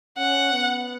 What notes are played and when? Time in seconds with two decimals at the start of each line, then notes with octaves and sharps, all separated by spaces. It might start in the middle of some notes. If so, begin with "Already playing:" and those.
0.18 C#4 F#5
0.52 B3